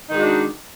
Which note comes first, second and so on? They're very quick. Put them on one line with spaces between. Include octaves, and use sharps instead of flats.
D#4 D#3 G#3 F#4 D4